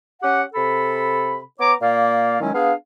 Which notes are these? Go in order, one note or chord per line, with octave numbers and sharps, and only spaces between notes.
C#4 G4 F#5
C3 A4 B5
B3 C#5 A#5 D6
A#2 A#3 D5 F5
D#3 F#3 G#3 C#4 E4
B3 D4 G#4 F5